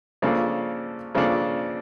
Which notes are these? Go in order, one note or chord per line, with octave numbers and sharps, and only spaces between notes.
C#3 F3 A#3 D4 A4
C#3 F3 A#3 D4 A4